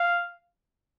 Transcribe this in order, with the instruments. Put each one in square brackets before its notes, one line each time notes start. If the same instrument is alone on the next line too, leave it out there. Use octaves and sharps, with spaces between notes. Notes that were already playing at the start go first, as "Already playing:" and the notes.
Already playing: [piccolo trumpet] F5